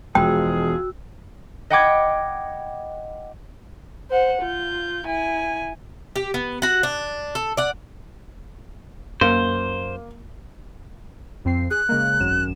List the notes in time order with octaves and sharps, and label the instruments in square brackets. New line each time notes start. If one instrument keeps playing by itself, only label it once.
[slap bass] E1 G#3 [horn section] F3 G#4 [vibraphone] F#4 E6 [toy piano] G5
[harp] D#5 F#5 G5 B5 D6 G#6
[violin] C5 F#5
F4 G6
E4 G#5
[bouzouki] G4
B3
F#4 F#5
D4
A4
D5 F#5
[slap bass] F#2 [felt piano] A#3 [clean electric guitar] C5
[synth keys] F2 C4 C7
[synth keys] G#4 [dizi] F#6
[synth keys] C#3 G#3 A#3
G#1 F#2 E7